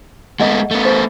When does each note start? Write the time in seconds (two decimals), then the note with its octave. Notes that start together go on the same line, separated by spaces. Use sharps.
0.40 G#3 A3 B3 D#5 F#5
0.71 A3 B3
0.85 C5